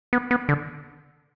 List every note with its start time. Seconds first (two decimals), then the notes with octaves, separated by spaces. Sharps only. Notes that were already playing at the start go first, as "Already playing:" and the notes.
0.13 B3
0.31 B3
0.49 D3